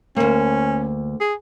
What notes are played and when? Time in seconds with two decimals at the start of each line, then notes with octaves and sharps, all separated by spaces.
0.16 D2 A#3 C#4
1.21 G#4